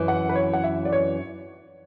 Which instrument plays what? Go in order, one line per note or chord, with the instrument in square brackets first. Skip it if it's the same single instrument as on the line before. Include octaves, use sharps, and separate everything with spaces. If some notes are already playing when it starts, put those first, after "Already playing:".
Already playing: [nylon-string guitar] F#2 E3
[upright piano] F#5
B4
C#5
F#5
E5
D5
C#5